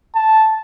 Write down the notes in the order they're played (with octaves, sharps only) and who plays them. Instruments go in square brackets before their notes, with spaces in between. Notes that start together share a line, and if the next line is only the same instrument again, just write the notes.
[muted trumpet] A5